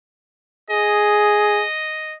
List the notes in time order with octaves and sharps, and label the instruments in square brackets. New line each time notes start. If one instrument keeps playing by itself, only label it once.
[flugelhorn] G#4 [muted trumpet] D#5